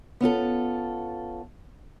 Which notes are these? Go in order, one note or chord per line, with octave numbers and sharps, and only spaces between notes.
B3 C#4 F4 A4